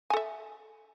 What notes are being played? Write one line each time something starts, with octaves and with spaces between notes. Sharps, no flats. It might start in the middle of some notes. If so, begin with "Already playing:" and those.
A4 E5 G#5